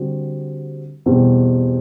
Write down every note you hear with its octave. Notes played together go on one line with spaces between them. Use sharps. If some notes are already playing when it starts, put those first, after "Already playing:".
Already playing: D3 G3 C4 F#4
E2 B2 G3 C4 G4